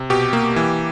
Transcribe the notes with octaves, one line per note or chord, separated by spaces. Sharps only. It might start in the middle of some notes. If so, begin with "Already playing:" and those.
Already playing: C3
B2 G4
A#3
E3